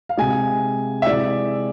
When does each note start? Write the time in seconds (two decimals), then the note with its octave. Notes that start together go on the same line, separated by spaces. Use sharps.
0.09 F5
0.17 C3 G#3 G#5
1.02 E5
1.06 C3 E3 G#3 D5